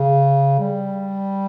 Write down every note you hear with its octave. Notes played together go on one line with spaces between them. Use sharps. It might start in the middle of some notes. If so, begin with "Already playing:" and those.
Already playing: C#3
G3